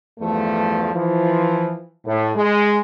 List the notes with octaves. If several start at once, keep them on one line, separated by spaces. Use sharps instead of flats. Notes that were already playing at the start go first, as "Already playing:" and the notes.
E2 G2 F3 A3
E3 F3
A2
G#3